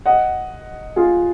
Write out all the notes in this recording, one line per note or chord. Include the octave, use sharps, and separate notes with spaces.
D#5 F#5
F4 G#4